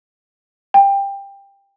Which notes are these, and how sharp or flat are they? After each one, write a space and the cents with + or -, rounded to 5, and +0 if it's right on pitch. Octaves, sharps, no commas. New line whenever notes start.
G5 +20